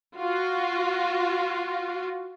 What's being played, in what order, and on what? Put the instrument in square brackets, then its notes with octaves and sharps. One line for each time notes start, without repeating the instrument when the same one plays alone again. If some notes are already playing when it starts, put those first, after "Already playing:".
[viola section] F4 F#4